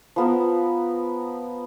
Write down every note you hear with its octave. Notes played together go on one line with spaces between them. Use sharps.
F3 B3 A#4